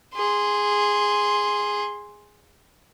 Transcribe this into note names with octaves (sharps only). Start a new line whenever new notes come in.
G#4 C6